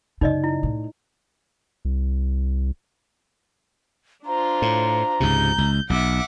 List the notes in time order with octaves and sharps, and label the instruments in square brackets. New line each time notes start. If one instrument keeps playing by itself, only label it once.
[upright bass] F#2 C#3 [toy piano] D#4 D5 D#5
[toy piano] E4
[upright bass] A2
[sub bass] C2
[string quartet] D4 F4 C5 [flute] A#5
[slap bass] A2
[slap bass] C#2 G#2 C3 [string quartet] G6
[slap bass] C#2
[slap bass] B1 [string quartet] E5 F#5 D6